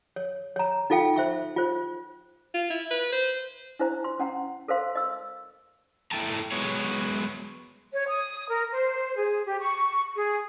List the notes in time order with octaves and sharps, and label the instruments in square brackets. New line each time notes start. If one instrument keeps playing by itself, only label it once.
[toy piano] C#5
C#5 A#5
D#4 F4 A4 F5 G5
C5 E5 C#6
F4 C5
[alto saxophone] F4
E4
B4
C5
[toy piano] D4 E4 C5 A#5
C6
C#4 F#5 A#5
A4 A#4 C5 F5 C6
D#5 E6
[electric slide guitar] E4 A4 G5 A5 A#5
F#3 G#3 B3 C#5
[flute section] C#5
D#6
A#4
C5
G#4
G4
C#6
G#4